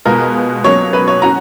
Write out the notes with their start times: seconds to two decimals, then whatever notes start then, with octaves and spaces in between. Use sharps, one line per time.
0.05 B2 G#3 B3 F4 A#4
0.64 B2 F#3 A#3 C#4 C#5
0.93 B4
1.08 C#5
1.22 C#4 F#4 A#5